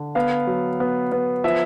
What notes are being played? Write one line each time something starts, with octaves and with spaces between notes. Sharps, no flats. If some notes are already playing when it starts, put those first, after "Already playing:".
Already playing: D3
B3 F5
F#3
B3
B3
F3 E5